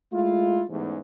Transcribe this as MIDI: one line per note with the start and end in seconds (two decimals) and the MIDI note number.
0.13 0.64 56
0.13 0.64 57
0.13 0.64 64
0.13 0.64 65
0.69 0.98 33
0.69 0.98 40
0.69 0.98 44